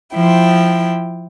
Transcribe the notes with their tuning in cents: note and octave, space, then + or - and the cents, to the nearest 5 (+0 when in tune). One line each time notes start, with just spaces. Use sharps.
F3 +0 E4 +0 G5 -5